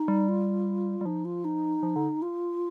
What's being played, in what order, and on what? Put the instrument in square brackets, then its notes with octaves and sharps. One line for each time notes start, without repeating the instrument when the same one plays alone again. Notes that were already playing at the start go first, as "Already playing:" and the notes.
Already playing: [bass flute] D#4
[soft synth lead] G3
[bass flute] F4
[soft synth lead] G3
[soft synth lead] F3 [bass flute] D#4
[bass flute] F4
D#4
[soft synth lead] F3
D3
[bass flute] F4